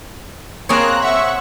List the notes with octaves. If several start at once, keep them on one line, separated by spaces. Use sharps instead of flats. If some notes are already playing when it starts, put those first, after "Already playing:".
A#3 C4 G#4 C#5 A#5 F#6
E5 F#5 C#6